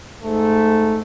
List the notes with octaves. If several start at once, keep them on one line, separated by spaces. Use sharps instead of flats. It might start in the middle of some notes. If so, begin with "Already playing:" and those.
G#2 A3